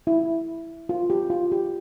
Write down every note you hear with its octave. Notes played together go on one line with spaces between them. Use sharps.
E4
F4
G4
F4
G4